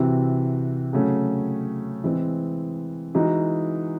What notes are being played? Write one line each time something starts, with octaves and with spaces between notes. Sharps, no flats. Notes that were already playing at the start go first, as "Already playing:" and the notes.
Already playing: C3 E3 C4 F#4
C#3 F#3 A3 C#4
E3 G#3 C4
E3 G#3 D#4 F#4